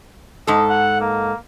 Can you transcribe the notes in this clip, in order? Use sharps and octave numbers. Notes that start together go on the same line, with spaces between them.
G#2 A4 D#5
F#5
A#3